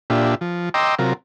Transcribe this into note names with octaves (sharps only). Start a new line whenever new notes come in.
A#2 D4 F4 G4 E5
F3
D#5 G5 A#5 C6 D6 E6
C3 F#3 F4 A#4